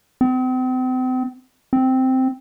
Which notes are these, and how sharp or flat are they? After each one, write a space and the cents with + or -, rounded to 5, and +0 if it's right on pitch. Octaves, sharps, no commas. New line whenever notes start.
C4 -40
C4 -5